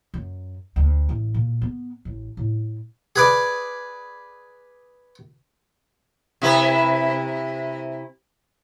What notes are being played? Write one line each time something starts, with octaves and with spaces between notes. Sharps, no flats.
F#2
D2
A1
A#2
B3
A1
A2
G#4 B4 D5
C3 E4 B4